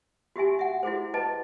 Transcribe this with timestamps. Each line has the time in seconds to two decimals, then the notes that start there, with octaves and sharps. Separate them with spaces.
0.36 F#4 G4 E5 G#5
0.59 E5 F#5
0.83 E4 F#4 G#4 C5
1.14 B4 D#5 A5